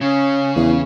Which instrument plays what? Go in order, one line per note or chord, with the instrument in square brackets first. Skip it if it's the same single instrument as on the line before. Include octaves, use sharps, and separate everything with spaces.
[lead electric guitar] C#3 [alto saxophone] C#4
[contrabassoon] E2